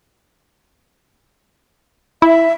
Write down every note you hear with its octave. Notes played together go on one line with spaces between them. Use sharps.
E4 E5